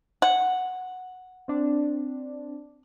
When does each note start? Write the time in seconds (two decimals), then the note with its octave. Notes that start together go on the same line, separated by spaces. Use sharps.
0.22 F#5
1.48 C4 D4